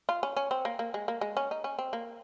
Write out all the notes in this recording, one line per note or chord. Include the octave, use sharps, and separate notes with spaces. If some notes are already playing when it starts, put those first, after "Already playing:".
F4
C#4
C#4
C4
A#3
A#3
G#3
A#3
G#3
C#4
D#4
C#4
C4
A#3